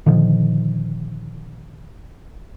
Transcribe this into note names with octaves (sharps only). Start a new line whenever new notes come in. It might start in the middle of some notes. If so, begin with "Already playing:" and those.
A#2 D3 D#3 F3